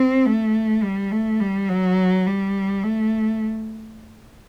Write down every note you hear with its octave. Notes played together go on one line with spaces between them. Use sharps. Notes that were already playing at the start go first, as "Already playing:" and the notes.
Already playing: C4
A3
G3
A3
G3
F#3
G3
A3